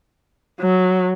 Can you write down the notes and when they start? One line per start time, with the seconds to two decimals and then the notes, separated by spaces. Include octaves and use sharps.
0.60 F#3